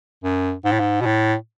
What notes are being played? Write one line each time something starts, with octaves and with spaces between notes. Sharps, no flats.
F#2
G#2
A2
G#2
B2
A2